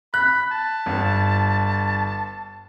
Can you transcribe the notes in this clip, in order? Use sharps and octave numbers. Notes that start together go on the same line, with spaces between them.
B5 F#6
A5
G1